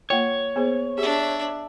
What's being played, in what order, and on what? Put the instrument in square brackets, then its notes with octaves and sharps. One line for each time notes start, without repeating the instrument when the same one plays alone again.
[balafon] A#3 F4 G5 [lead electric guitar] C#5
[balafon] B3 G#4 C5
[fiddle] D4 E5 [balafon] G4 G#4